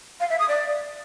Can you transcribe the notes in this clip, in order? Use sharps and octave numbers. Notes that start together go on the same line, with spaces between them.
F5
E5
D#6
D5